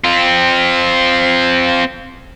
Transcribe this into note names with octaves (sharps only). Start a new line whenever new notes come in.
C4 F4